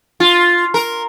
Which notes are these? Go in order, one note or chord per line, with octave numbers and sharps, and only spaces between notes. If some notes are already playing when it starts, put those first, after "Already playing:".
F4
A#4